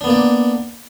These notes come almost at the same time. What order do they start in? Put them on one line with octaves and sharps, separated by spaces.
D4 B3 A#3 D5